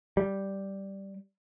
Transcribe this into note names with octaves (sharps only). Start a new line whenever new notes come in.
G3